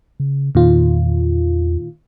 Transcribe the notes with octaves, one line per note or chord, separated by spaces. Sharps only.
C#3
E2 A#2 D#3 F4